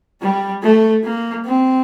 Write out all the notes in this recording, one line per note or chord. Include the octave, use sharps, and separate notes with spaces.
G3
A3
A#3
C4